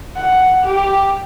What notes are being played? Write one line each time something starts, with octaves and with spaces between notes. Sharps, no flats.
F#5
G4